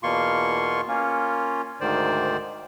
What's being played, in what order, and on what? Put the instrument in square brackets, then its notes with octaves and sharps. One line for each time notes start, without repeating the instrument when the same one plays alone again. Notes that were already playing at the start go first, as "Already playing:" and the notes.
[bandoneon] E2 B2 A#3 F4 C6 C#6
A#3 C#4 F4
D2 G#2 D#3 C5 D5